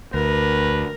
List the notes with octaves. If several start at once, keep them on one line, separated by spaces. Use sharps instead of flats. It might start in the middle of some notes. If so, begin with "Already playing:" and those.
D2 A#4 B4